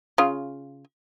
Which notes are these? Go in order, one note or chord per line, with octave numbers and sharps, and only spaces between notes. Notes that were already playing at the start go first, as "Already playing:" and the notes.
C#3 F4